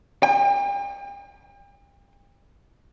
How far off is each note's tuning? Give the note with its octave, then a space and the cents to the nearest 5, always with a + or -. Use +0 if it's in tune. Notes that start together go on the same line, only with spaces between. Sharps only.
G5 +40